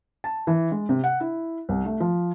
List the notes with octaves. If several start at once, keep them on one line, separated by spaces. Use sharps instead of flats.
A5
E3
G#3
C3
F#5
E4
C2
A3
F3